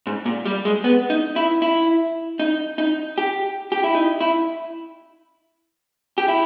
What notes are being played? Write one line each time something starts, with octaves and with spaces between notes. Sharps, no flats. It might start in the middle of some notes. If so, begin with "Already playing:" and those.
G#2
A#2
G3
G#3
B3
D#4
E4
E4
D#4
D#4
G4
G4
E4
D#4
E4
G4
E4